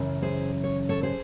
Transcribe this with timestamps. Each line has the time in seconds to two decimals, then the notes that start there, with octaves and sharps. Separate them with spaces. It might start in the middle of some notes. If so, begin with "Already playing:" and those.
Already playing: F#2 C#3 E3
0.22 G#4 C5
0.64 C#5
0.89 A4 C#5
1.03 G#4 C5